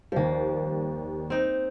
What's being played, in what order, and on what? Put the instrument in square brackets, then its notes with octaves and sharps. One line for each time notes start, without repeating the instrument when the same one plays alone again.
[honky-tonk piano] D#2 G3 [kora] F3 A#3
[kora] C4 D#4